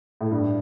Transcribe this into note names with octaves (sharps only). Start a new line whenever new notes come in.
A2
G2